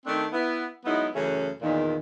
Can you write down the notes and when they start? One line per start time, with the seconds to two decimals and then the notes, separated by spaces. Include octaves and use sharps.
0.06 D#3 A3 C4 D4
0.32 B3 E4
0.85 F#3 G#3 B3 D#4 E4
1.14 F#2 C#3 E3 A3 C#4 G#4
1.62 E2 A#2 D#3